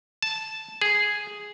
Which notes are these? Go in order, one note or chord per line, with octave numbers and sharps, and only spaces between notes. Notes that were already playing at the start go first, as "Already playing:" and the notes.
A5
G#4